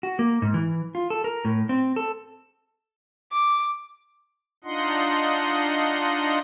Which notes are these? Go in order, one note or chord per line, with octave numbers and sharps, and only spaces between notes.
F#4
A#3
G#2
E3
F4
A4
A#4
A2
C4
A4
D6
D4 D#4 F4 D#5 F#5 C6